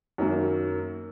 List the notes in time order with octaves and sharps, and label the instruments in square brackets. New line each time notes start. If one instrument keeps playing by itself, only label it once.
[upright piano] F#2 D#3 F#3 A#3